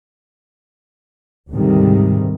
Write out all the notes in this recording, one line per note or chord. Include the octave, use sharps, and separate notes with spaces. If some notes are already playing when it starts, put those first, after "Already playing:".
D2 G#2 C3 D#3 G3